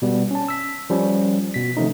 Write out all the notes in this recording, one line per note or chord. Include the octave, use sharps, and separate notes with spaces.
B2 G3 B3
C#4 A5
E6 B6
F3 G3 C#4
B2 B6
C3 D#3 F3 A3 C#4 D#4